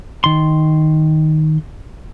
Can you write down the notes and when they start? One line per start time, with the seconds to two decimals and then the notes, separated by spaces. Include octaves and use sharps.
0.24 D#3 C6